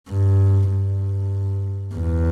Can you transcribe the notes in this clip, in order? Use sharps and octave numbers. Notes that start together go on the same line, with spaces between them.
G2
G2
E2